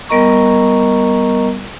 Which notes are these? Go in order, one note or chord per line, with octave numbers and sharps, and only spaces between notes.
G3 B3 A#4 D#5 A#5 C#6